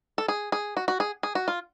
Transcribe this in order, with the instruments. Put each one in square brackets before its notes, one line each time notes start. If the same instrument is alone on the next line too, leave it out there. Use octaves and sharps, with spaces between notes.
[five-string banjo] A4
G#4
G#4
F#4
F#4
G#4
G#4
F#4
F4